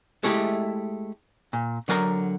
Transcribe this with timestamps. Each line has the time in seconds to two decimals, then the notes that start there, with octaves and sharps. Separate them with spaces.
0.23 G#3 A3 E4 G4
1.53 A#2
1.88 D3 F#3 A#4 G5 A#5